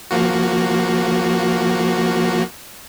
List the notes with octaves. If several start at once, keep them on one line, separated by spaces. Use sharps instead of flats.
F3 A#3 F#4